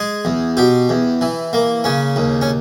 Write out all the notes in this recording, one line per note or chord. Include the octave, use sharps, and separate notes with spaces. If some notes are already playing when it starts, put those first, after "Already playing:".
Already playing: G#3 G#4
E2
B2 G4
E2
E3
A#3
C#3 C#4
D#2
C#4